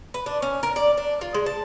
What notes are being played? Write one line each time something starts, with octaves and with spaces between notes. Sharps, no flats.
B4
D4
C#4
A#4
D5
D4
F4
G#3
A5